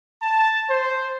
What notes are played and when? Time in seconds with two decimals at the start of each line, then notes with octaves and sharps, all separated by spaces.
0.22 A5
0.70 C5